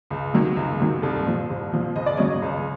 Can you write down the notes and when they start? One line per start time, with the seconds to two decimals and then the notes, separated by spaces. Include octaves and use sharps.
0.10 C#2
0.33 C3 D#3 F#3
0.56 C#2
0.80 C3 D#3 F#3
1.02 C2 A4
1.26 A#2 F3
1.50 C2
1.72 A#2 F3
1.95 C#2 D#5
2.06 D5
2.17 C#3 F#3 C#5 D#5
2.42 C#2